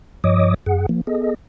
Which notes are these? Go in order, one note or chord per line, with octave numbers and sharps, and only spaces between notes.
G2 F3 C#5 D#5 D6 D#6
F#2 G#4 F#5
F3 A#3
B3 G#4 A4 D#5